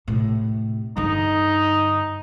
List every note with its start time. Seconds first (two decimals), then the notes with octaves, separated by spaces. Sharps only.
0.08 A2 C3
0.97 G2 D3 D#4